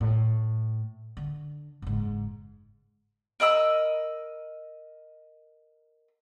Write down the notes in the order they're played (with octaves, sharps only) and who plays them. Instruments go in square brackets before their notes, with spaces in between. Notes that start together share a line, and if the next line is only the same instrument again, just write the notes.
[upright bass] A2
D3
F#1 G#2
[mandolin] A#4 D#5 B5 E6